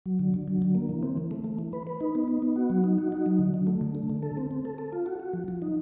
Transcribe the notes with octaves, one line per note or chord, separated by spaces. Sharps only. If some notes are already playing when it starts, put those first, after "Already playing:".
F#3
D3
D3
F#3
D3
A#3
E3
C4
E3
A3
A3
E3
B4
B4
D#4
B3
D#4
B3
F#4
F#3
D#4
F#4
D#4
F#3
D3
F#3
A3
D3
A3
D3
A4
C4
C4
A4
A4
F4
F#4
F#4
F3
F3
D#4